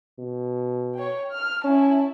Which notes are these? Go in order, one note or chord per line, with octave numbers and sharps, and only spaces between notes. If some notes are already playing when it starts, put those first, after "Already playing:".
B2
C#5 G5
F6
C#4 E4 A5